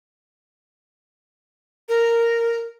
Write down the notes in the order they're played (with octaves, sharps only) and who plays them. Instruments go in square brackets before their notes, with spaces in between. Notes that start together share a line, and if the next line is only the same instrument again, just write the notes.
[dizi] A#4